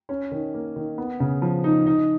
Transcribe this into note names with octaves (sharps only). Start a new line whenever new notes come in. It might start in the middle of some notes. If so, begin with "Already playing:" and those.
C#4
D#3
A#3
D#3
B3
C#3
F3
D#4
D#4